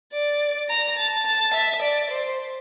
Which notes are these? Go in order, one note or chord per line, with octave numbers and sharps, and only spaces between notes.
D5
A#5
A5
A5
E5
D5
C5